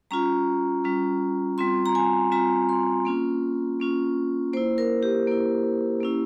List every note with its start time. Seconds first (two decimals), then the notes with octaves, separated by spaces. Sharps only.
0.11 G3 C#4 F4 A#5
0.84 G3 C#4 F4
1.58 G3 C4 F4 C6
1.86 A#5
1.95 G#5
2.32 G3 C4 F4 A#5
2.69 C6
3.05 A#3 C#4 F4
3.80 A#3 C#4 F4
4.53 A#3 E4 C5
4.78 A#4
5.03 G4
5.27 A#3 E4
6.01 A#3 C#4 E4